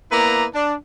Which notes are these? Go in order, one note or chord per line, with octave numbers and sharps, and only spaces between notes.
A#3 B3 E4 B4 D5 A#5
D4